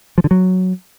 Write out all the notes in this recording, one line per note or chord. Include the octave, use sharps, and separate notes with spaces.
F3
D3
F#3